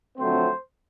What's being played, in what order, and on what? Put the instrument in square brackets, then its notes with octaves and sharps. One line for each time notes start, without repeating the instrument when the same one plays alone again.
[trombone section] F2 D3 F#3 A3 C4 C5